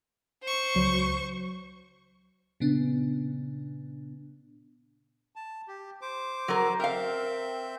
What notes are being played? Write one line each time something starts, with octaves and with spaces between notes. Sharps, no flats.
C5 C#6
C#2 F#3
A#2 C#3 B3 D4
A5
G4
C5 D6
F#3 A#4
C4 A#4 E5 F5 G6